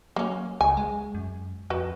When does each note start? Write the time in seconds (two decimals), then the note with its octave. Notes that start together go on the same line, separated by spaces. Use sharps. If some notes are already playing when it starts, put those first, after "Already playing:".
0.16 F#3 A#3 C#4
0.61 C#2 G#5
0.77 G#3
1.15 F#2
1.70 F2 F#4 B4